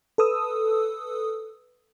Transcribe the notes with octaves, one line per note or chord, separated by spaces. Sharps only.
A4 B4 D#6 E6